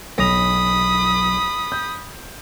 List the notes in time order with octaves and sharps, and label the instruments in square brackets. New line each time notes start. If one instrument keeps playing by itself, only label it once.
[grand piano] B1 A#6 F7 [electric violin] B5 D#6
[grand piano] G6